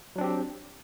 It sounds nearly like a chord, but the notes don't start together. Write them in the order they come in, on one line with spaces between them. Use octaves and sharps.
F#3 D4 C4 G4